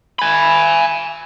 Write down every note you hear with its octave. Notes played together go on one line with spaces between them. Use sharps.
G#5 B5